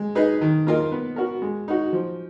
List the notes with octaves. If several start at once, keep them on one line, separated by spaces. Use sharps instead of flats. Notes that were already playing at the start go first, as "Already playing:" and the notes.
Already playing: G#3
D#4 G#4 B4 D#5
D#3
A#3 F4 A#4 D#5
B3
F#4 A#4
G#3
D#4 F#4
F3